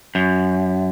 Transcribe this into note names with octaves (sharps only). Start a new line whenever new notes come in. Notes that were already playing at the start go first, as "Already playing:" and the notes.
F#2